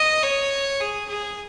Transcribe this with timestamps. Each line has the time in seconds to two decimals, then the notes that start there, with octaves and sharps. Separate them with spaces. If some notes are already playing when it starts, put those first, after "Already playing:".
Already playing: D#5
0.23 C#5
0.80 G#4
1.09 G#4